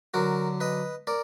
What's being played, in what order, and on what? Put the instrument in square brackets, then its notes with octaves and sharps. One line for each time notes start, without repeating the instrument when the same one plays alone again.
[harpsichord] D3 F#3 F#4 A#4
B4 D#5
A#4 D5